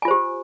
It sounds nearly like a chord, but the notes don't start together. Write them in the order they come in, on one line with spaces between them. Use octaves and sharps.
G#5 F4 C5 G4